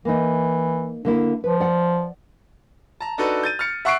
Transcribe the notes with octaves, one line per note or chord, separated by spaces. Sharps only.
E3 A#3 D#4
D3 A#3 E4
F3 B4
D5 F#5
A5 A#5
D4 D#4 F#4 A4 B4
G6 A6 D#7
F6 A6 C#7
E5 F#5 C#6 F#6 C7 D7